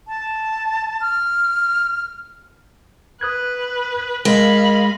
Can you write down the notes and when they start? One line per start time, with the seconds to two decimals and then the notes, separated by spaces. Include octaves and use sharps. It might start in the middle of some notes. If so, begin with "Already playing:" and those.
0.08 A5
1.01 F6
3.21 B4 D#6 F#6 G#6
4.25 G#3 A#4 D#5 F5 B5